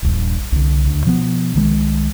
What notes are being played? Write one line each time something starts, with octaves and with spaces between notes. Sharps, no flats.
D#1 A#1 G2
C2 D3
D2 D3
B2 F3 G3 B3
C2 D#3 G#3